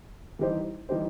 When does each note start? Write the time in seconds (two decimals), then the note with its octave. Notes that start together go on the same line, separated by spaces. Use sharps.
0.39 E3 G3 D#4 G4 C5
0.89 E3 G3 D#4 G4 C5